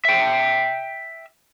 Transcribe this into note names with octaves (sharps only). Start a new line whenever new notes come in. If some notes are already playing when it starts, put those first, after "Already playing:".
E5 G5